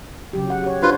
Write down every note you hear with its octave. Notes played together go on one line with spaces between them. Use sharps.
C#3 F#3 G4
F#4 F#5
G4 C#5
D4 F4 F#4 B4 C5